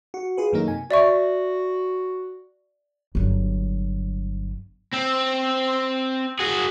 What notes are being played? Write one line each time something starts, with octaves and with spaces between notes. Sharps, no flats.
F#4
F4 G#4 B4
F#2 D#3 F#3 A3 A#3 D#4
C3 G#5
F#4 D5 E5 C#6
G1 F#3
C4
F#4 G#4